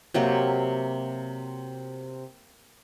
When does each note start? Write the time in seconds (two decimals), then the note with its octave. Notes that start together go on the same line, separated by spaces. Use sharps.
0.14 C3 F#3 A#3 G4